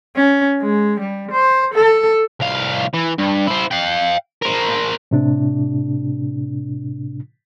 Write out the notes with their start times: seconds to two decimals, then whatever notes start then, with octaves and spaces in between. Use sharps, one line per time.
0.16 C#4
0.62 G#3
1.00 G3
1.32 C5
1.75 A4
2.40 C2 F5
2.94 E3
3.19 G2
3.48 E4 C5
3.71 F5 G5
4.42 A#4 C5
5.11 A2 C3 D4